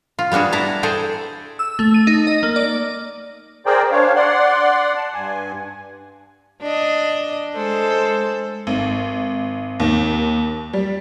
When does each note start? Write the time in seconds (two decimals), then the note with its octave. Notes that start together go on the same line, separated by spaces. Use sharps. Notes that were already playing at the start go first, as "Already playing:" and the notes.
0.19 F4
0.32 G3 B3 D4 F#4 G#4
0.52 D4 E4 A5 A#5
0.83 G#4 A4 C5 G5
1.59 E6
1.79 A3
1.94 D#7
2.07 D#4
2.27 D#5
2.43 A#3
2.56 D5
3.66 G#4 A#4 C5 D5 G5
3.92 D4 C5 C#5 F5
4.16 D5 F#5 C6
4.95 A5
5.14 G2 G#5
6.62 D4 D#5
7.56 G#3 A4 C5
8.67 G#1
9.80 D#2
10.73 G3